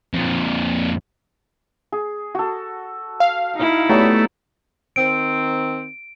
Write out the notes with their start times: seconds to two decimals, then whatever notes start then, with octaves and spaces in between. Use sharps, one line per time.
0.13 F2 A#2
1.92 G#4
2.35 F#4 A4
3.20 F5
3.55 D#4 E4
3.89 F#3 G3 A3 B3
4.96 D#3 C4 D7